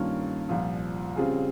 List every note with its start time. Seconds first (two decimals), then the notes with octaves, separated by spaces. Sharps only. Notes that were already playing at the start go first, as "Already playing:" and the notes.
Already playing: G2 D#3 A#3 C#4 F4
0.49 C2 A#2 F3
1.16 C#3 G3 C4 F4 G#4